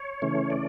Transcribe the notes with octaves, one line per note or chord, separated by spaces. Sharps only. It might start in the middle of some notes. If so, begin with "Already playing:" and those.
Already playing: C#5
C#3 E3 A3 C#4
D5